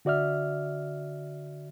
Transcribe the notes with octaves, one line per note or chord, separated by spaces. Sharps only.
D3 F#4 D5 E5 F6